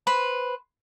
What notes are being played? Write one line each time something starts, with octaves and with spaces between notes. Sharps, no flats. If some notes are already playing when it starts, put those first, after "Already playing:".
B4 C5 B5